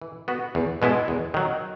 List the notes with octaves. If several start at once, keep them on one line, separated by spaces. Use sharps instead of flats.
E3
B3 F#4
E2
B2 G#3 B3 E4
E2
D#3 F#3